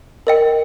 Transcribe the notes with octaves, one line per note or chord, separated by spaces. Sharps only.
A#4 D#5 G5